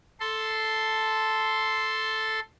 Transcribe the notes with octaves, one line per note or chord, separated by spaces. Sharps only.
A4 C6